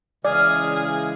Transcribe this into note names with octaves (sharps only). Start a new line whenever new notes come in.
C#3 E3 G#3 G#4 D5 F6